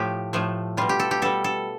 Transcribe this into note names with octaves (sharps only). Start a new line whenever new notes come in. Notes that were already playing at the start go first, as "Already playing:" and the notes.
Already playing: A2 F3 A3 G4
A2 F3 A3
B2 G3 F4
G4
A4
G4
B2 G3 A4
A4